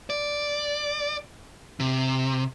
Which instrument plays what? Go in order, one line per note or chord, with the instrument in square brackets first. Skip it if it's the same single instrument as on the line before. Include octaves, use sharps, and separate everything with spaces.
[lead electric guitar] D5
C3